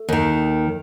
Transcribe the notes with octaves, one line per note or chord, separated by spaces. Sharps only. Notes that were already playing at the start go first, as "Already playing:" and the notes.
Already playing: A3
D#2 D#3